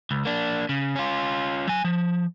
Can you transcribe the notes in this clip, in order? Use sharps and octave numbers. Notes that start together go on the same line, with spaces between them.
C#2
A#3 D4
C#3
C#4 F4
F#3 G#5
F3